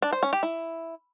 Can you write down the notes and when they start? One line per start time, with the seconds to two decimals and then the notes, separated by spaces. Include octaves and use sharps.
0.02 D4
0.13 C5
0.23 C#4
0.33 G4
0.43 E4